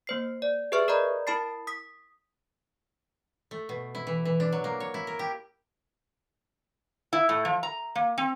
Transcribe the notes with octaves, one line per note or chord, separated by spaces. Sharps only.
A#3 C5 C7
D5
G4 G#4 B4 E5 C#6 F6
A#4 D5 D#5 A#5 B5
E4 A#4 A5 B5 A6 C7
D#6 B6
A3
B2
E4
E3
E3
D4
F#3
A#3
C#5
E4
A#4
G4
E4
A2
F3
A#5
A#3
C4